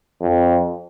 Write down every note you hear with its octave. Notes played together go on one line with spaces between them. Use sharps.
F2